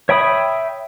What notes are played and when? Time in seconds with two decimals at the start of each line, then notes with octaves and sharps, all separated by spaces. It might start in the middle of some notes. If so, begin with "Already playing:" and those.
0.09 C#5 E5 G5 B5 D#6